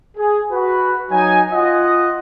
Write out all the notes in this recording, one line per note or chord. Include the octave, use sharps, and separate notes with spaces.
G#4
F#4 B4
F#3 D#4 G#5
F4 D#5 F#5